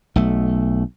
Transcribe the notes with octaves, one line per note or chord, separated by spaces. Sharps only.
B1 A3